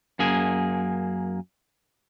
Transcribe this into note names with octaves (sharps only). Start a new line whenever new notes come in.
F#2 A#3 G#4